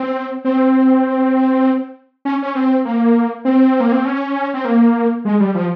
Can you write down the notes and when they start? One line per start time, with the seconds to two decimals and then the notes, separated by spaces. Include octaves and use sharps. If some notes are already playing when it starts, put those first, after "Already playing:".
Already playing: C4
0.45 C4
2.25 C#4
2.42 C#4
2.55 C4
2.85 A#3
3.45 C4
3.80 A#3
3.92 C4
4.05 C#4
4.54 C4
4.65 A#3
5.25 G#3
5.40 G3
5.55 F3